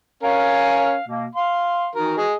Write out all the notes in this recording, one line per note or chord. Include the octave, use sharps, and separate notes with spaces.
C#4 A#4 F5 G#5
B2 A#3
F5 C6
D#3 E3 F#4 A#4
G#4 D#5